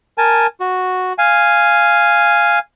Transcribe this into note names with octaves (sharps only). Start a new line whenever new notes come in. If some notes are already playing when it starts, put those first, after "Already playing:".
A#4 G#5 A5
F#4
F5 G#5